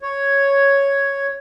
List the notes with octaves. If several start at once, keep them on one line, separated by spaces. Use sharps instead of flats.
C#5